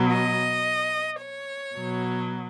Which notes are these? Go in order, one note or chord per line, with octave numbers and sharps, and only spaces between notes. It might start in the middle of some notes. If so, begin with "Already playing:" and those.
Already playing: B2 F#3
D#5
C#5
B2 F#3